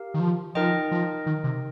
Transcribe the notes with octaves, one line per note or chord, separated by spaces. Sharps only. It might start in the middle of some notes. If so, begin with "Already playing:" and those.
Already playing: G4 A#4 F5
D#3
F3
F3 D#4 A#4 D#5 G5
F3
D#3
C3